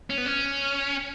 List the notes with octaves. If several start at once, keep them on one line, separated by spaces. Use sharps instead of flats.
C#4
B3
C#4